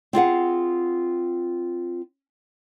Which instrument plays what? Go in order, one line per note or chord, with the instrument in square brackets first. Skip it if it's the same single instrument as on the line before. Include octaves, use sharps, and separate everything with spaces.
[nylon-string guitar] C4 F4 G#4 F#5